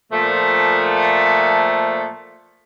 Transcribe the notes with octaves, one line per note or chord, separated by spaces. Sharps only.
A#2 F3 A3